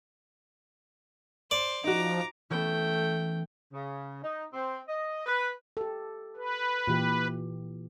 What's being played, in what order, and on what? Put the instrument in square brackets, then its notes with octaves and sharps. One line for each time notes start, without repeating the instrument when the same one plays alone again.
[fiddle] C5 [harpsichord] D5
[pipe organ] F3 [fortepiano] D#4 F#4 [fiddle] A#5 D6
[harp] E3 B3 C#4 [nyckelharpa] A3 G5
[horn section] C#3
D#4
C4
D#5
B4
[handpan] G4 A4
[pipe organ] B4
[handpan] A#2 E3 G4